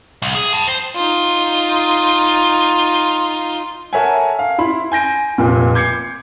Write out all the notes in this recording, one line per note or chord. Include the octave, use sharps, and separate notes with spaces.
C2
G#4
G5 A5
C5
D#4 F4
A4 A#4 C#5 E5 F#5 G#5
F5
E4 B5 C6
G#5 G6 A#6 D7
F1 A#2
D6 G6 G#6 C7 C#7